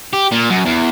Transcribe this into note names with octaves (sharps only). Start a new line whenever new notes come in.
G4
A#2
F#2
E2